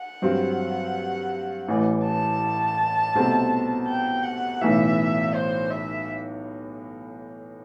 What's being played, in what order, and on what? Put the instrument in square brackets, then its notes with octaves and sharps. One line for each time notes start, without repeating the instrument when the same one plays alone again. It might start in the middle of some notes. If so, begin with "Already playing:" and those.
Already playing: [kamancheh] F#5
[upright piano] G2 F#3 C4
A1 A2 E3
[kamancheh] A5
[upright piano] C2 B2 A3 C4
[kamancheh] G5
F#5
[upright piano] B1 A2 E3 [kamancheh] E5
[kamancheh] C5
E5